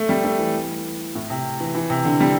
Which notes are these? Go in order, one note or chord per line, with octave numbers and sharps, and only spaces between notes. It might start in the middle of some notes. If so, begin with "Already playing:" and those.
Already playing: A3
G3
A3
E3
A2
C3
E3
E3
C3
D3
G3